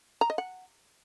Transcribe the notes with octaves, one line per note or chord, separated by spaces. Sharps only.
A#5
D#5
F#5